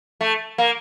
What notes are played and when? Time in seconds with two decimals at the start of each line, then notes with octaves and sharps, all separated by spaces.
0.21 A3
0.58 A#3